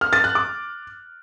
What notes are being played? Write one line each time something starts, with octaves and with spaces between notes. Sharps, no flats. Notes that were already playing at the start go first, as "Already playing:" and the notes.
F6
A6
F#6
D6